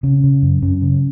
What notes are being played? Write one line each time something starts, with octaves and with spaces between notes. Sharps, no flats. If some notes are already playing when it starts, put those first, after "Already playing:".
C#3 C#4
C#3
F#2
F#2 C#4
C#3